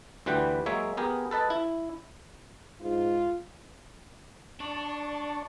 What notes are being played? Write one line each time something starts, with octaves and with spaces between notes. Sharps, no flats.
D2 E3 G3 B4 F#5 G5
F#3 G#3 A#3 C#5 E5
B3 G4 G#4 A#4
A4 B4 D#5 A5
E4
G#2 F4
D4 D5 A5 C#6